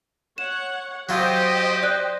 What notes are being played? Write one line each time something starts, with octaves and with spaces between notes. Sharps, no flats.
C#5 F#5 E7
F#3 F4 G4 C5 D#5 G5
D5 F#6